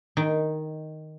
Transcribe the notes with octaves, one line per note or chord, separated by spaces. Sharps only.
D#3